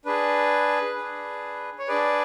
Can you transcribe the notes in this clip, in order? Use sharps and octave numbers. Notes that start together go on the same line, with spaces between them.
D4 G#4 B4
D4 G#4
C#5
D4 G#4 B4 D5